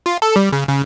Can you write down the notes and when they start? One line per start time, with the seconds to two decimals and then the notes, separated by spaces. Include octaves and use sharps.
0.06 F4
0.22 A4
0.36 G3
0.52 C#3
0.68 C#3